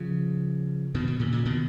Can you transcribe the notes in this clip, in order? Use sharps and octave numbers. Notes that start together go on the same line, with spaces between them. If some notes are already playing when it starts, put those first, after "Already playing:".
Already playing: C#3 F3
B2 D#3
B2 D#3
A#2 C#3
A#2 C#3
B2 D#3